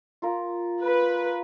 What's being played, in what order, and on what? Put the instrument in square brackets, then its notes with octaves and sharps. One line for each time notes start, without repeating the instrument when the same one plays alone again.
[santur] F4 A#4
[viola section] B4